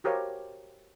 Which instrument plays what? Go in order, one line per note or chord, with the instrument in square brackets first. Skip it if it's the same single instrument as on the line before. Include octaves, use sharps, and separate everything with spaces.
[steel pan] F#4 G4 A#4 C5 C#5 F5